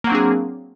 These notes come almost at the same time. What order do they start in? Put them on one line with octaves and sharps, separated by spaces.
A#3 F#3 C4 D4 G#4